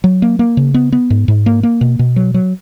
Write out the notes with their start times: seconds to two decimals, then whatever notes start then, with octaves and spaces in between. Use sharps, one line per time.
0.04 F#3
0.22 A#3
0.39 A#3
0.57 C#3
0.74 B3
0.92 B3
1.10 G#2
1.28 G#2
1.46 A#3
1.63 A#3
1.81 B2
1.99 B2
2.16 F#3
2.34 F#3